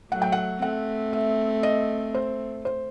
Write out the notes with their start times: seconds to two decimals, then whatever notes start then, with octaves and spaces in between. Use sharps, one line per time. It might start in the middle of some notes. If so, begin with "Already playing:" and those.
0.11 F#3 A3 F#5
0.22 G5
0.32 F#5
0.62 A3 C4 F#5
1.13 E5
1.63 D#5
2.14 C5
2.65 C5